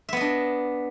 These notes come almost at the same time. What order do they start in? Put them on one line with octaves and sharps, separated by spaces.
E5 B3 D#5 D4